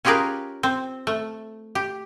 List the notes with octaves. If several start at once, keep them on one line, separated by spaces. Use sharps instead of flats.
C#4 F4 G4 G#4 A#4 B4
C4
A3
G4